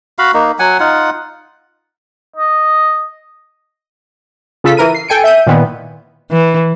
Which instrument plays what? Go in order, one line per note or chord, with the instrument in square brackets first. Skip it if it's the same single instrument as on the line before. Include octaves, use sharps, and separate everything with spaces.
[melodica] F#4 F5 B5
A#3 D#4
F#3 F#5 G#5
D#4 F4 F#5
[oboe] D#5
[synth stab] C#3 F4 A4 B6
E3 A#4 D#7
C7
A4 G5 G#5 C#7 D7
E5 G6 D#7
A#2 D#3 E3 B3
[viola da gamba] E3